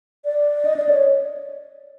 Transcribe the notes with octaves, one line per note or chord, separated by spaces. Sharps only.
D5
D#5
D5
C#5